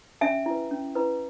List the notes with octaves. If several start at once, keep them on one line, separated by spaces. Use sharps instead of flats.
C#4 E5 G#5
E4 B4
C#4
E4 B4